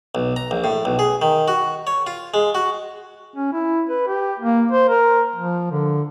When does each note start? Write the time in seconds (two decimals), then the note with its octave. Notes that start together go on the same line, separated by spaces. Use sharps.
0.15 B1
0.36 A#5
0.51 A#1
0.64 A2
0.85 B1
0.99 G#4
1.22 D#3
1.48 F#4
1.87 C#5
2.07 F4
2.34 G#3
2.55 F#4
3.36 C#4
3.53 E4
3.89 B4
4.08 G4
4.40 A#3
4.72 C5
4.89 A#4
5.36 F3
5.72 D3